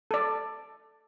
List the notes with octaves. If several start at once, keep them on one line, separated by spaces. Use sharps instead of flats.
A4 D5